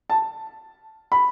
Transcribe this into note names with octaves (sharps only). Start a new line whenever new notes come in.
A5
B5